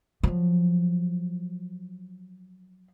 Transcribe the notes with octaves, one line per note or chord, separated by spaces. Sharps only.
F3 F#3